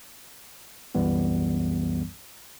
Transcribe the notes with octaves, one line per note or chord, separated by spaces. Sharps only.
C2 F#2 E3 G3 B3